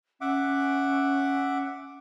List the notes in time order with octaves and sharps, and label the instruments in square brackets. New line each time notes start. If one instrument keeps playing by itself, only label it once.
[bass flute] C#4 [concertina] E5 F#5 D6